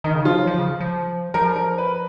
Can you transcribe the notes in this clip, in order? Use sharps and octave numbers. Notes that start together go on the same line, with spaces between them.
D#3 D#4
C#3
F3 F4
F#3
F3
C#3
F3
F3 A#4
A#4
B4